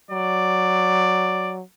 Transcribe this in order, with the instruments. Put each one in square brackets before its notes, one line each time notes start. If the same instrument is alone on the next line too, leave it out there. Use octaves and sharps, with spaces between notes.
[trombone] F#3 [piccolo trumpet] D5